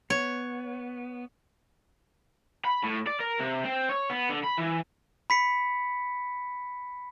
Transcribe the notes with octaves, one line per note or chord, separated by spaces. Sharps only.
B3 C#5
B5
A2
D5
A#4
C3
C4
C#5
B3
D3
B5
E3
B5 B6 C#7